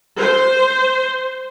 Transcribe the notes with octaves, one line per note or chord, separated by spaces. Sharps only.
C5